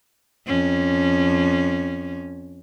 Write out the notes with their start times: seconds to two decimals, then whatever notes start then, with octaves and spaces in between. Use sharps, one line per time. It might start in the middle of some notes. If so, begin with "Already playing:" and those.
0.47 F2 C#4